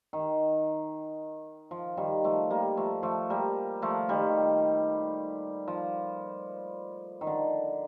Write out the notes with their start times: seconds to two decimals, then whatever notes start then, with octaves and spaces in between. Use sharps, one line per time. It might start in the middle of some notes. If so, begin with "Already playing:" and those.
0.13 D#3
1.71 F3
1.97 D#3 G3
2.24 F3 A3
2.50 G3 A#3
2.77 F3 A3
3.03 F3 A3
3.30 G3 A#3
3.82 F3 A3
4.09 D#3 G3
5.68 F3
7.21 D#3
7.27 D3